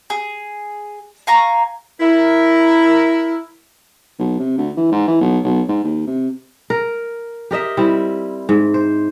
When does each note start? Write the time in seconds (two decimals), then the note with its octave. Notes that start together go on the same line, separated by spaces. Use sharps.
0.10 G#4
1.27 F5 G#5 A#5 C#6
2.01 E4 A#4
4.19 B1
4.39 C3
4.58 D2
4.77 E3
4.91 G#2
5.07 E3
5.21 B1
5.44 B1
5.68 G#2
5.84 D#2
6.07 C3
6.70 A#4
7.51 G4 A#4 D#5 E5
7.77 G3 C4 E4
8.49 G#2
8.74 C5